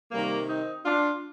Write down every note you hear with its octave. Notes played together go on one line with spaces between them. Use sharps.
C3 D#3 G3 A#3
C4 D#4
D4 F4